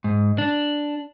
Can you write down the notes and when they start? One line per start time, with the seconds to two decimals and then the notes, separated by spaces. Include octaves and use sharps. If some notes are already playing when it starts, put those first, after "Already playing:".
0.04 G#2
0.38 D4